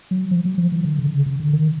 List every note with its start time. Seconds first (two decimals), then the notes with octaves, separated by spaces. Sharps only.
0.11 F#3
0.31 F3
0.45 F#3
0.58 F3
0.72 E3
0.85 D3
0.99 C#3
1.07 D3
1.13 C#3
1.26 C#3
1.40 D3
1.53 D#3